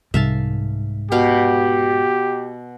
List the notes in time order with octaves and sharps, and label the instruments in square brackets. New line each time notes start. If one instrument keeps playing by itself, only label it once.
[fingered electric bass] C2 [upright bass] G#2 [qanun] E5 F5 A5
[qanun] B2 F5 [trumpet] G4